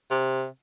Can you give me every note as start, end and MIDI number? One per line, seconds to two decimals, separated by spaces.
0.11 0.46 48